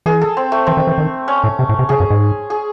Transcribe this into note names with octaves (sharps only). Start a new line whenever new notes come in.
E3 G#4
A4
C4
A3
E3 C4
D#3
E3
D#3
C#4
A2
C3
A2
C3
C#3 G#4
F#2
G#2
G#4